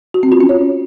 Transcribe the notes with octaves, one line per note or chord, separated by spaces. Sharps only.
F#4
C4
F4
C#4
C#5